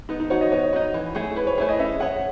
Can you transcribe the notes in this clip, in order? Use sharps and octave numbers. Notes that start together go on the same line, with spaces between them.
B3 D#4
D#4
D#4 F#4 C#5
D#5
B3 C#5
D#4 F#4
E3
A3 E4 G#4
E3 B4
C#5
A3 E4 G#4 B4
D#5
C#4 E5
G#4 C#5 F#5